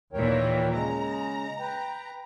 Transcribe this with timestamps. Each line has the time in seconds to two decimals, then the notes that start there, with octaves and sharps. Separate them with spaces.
0.13 D#2 A#2 E3 A#4 C#5 G5
0.73 C#3 G#3 A#5
1.59 B4 G5